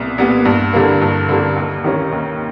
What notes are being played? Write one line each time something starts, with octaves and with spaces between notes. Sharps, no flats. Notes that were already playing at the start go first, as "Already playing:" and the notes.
Already playing: C2 A#2 B3
A#2 G3 B3
G2
D3 G3 A#3
G2
D3 G3 A#3
D#2
D#3 G3 A#3 C#4
D#2